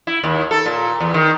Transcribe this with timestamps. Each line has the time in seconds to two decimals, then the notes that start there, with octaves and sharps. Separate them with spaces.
0.07 E4
0.24 D#2
0.51 A4
0.66 A#2
1.00 E2
1.14 D#3